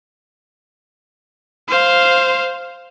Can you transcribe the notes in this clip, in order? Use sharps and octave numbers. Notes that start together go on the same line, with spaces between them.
C5 F5